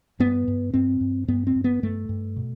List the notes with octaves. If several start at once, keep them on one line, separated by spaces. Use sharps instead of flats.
G2 B3
G2
G2 C4
G2
G2 B3
C4
G2
B3
G2 A3
G2
B2